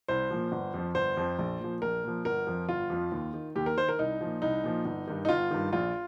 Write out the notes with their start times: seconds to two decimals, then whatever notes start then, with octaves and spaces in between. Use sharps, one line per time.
0.08 C2 C5
0.31 A#2 F3
0.52 G1
0.74 F2 F3
0.95 G1 C5
1.17 F2 F3
1.39 A#1
1.60 A#2 F3
1.82 A#1 A#4
2.04 A#2 F3
2.25 G1 A#4
2.47 F2 F3
2.69 G1 F4
2.90 F2 F3
3.12 D#2
3.34 D#3
3.56 D#2 G4
3.66 A#4
3.77 D#3 C5
3.89 A#4
3.99 C2 D#4
4.21 A#2 F3
4.42 C2 D#4
4.64 A#2 F3
4.85 G1
5.07 G2 D#3
5.25 D#4
5.29 G1 F4
5.51 G2 D#3
5.72 A#1 F4